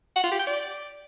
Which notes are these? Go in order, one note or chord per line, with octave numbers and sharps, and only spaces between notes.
F#5
F4
G4
G5
D5